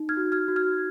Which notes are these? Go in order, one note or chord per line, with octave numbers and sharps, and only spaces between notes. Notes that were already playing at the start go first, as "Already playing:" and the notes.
Already playing: D#4
F6 G#6
F#4
F6 G#6
F#4
F6 G#6